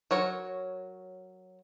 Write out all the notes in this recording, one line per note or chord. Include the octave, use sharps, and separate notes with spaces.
F#3 A#4 C#5